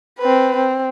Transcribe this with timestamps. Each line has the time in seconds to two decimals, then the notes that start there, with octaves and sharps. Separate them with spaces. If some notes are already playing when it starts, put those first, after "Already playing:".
0.19 C4 B4
0.56 C4